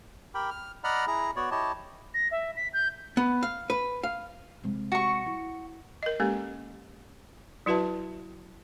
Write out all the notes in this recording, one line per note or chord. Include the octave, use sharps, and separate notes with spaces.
G4 A#4 G5 B5
F6
D5 D#5 F#5 A#5 B5 F6
E4 G#4 A#5
B3 F#4 C#5 D5
E4 G4 C#5 D#5 A5
A#6
E5
B6
G6
B3
F5
B4
F5
C3 G#3
F#4 C#6
E4
A#4 D#5
G#3 A#3 C#4 G4 A4
F#3 E4 F#4 B4 E5 A5